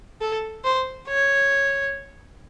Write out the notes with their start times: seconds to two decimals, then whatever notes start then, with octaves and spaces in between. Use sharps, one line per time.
0.21 A4
0.64 C5
1.07 C#5